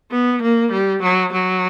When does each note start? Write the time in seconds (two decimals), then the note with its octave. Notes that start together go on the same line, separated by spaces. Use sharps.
0.12 B3
0.42 A#3
0.72 G3
1.03 F#3
1.33 F#3